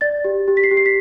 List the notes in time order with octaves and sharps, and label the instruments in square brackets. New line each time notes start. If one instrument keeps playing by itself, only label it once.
[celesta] D5 A6
G4
G4
B6
C7
G4
C7
B6